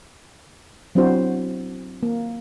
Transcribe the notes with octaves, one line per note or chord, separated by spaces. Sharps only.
F#3 C4 D4 E4 F#4 C5
A#3